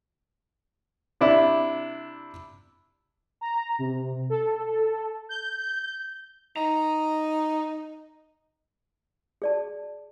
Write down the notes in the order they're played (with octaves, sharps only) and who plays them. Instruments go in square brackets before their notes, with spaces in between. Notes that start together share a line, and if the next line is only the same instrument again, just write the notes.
[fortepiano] C3 D4 E4
[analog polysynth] A#5
C3
A4
G6
[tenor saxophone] D#4 [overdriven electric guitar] A#5
[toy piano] G#4 D5 A5